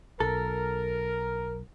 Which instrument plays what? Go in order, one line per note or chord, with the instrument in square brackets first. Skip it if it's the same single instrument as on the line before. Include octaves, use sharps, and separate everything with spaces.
[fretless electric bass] B1 [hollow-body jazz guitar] A4 [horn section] A#4